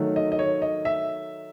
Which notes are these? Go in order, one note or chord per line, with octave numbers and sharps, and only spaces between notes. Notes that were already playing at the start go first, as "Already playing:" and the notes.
Already playing: D#3 F#3 A3
D#5
D#5
C#5
D#5
E5